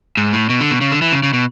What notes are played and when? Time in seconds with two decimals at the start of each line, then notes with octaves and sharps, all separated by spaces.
0.17 G#2
0.33 A2
0.49 B2
0.60 D3
0.71 B2
0.81 C#3
0.92 D3
1.02 E3
1.12 C#3
1.23 C#3
1.33 B2